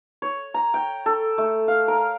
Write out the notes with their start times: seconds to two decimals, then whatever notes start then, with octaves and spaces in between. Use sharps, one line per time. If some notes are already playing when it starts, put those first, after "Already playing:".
0.22 C#5
0.54 A#5
0.74 G5
1.06 A4
1.38 A3
1.68 F5
1.88 A#4